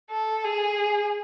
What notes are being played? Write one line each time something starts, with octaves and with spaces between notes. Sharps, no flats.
A4
G#4